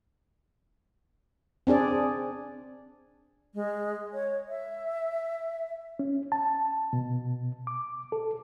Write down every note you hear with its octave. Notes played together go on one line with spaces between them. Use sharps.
C4 D4 G#4 D5
G#3
C#5
E5
C#4
A5
B2
D6
A4